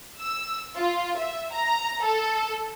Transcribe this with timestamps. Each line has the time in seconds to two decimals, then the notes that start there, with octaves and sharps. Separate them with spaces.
0.21 E6
0.77 F4
1.18 E5
1.54 A#5
2.04 A4